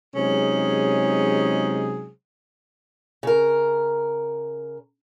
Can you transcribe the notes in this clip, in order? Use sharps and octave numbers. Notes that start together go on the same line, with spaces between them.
C3 F#3 G#3 C#4 D#4 G#4
C#3 A#4